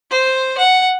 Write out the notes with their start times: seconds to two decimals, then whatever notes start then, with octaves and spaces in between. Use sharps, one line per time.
0.11 C5
0.58 F#5